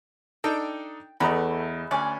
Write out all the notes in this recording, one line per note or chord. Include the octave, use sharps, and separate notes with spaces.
D4 D#4 A4 G5
E2 A3 B4 D#5 A#5 B5
D2 C#4 D5 G#5